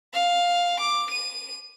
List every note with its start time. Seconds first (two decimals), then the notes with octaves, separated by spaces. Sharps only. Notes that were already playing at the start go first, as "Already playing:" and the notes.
0.13 F5
0.80 D6
1.11 D#7